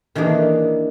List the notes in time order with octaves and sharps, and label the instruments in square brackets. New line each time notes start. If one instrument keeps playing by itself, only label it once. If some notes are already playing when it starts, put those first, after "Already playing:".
[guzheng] D#3 E3 A#3 D4 G#4